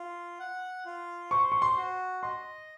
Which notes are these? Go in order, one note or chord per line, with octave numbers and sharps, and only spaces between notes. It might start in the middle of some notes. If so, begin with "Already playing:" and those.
Already playing: F4
F#5
F4
C5 C#6
C#6
C6
F#4
D#5 C6